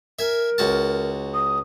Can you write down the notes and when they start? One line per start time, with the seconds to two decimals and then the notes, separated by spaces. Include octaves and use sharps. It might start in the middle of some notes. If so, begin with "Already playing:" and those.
0.19 A#4 E5 G#5
0.58 C#2 F#4 A5
1.34 D#6